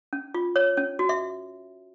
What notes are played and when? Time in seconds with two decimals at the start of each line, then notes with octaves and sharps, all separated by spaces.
0.13 C#4
0.34 F4
0.56 C#5
0.77 C#4
0.99 F#4
1.09 E5